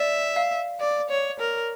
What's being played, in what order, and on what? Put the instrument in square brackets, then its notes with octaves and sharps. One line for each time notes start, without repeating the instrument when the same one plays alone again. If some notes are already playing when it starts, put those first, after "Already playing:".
Already playing: [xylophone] D5 [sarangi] E5
[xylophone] F5
[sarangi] D5
C#5
A#4